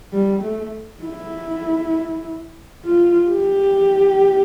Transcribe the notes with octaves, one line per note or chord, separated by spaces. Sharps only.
G3
A3
E4
F4
G4